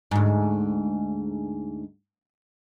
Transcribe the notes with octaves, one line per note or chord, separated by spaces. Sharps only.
D2 G#2